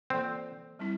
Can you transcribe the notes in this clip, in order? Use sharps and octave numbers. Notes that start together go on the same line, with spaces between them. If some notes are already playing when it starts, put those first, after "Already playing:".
E3 A#3 C4 F4 A4 D5
G3 C4 E4